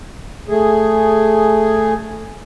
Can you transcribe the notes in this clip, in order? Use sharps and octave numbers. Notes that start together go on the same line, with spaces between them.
A3 G#4